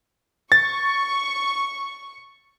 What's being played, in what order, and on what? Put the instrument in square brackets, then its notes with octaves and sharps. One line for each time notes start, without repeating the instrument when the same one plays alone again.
[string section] C#6 [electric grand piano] A6